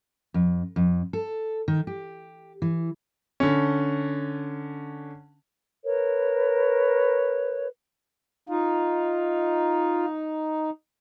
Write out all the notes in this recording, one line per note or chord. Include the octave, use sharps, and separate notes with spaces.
F2
F2
A4
D#3
G4
E3
D3 C#4
A#4 B4 C#5
D#4 F4